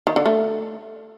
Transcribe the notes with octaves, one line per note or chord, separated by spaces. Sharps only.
D#3
D3
A3